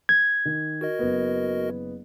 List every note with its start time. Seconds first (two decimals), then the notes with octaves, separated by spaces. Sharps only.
0.09 G#6
0.45 D#3
0.81 F#4 A#4 D#5
0.99 F#1 B3